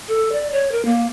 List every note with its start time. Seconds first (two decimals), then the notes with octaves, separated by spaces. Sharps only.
0.08 A4
0.32 D5
0.52 C#5
0.72 A#4
0.85 A#3